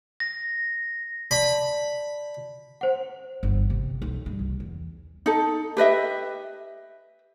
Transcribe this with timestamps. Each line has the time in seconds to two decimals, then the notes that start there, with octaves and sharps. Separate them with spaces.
0.20 A#6
1.31 D5 A5 B5
2.81 C5 F#5
3.43 G1
3.70 C3
4.02 B1
4.26 G2
4.39 C2
4.60 E2
5.26 D#4 A4
5.77 G4 B4 D#5 E5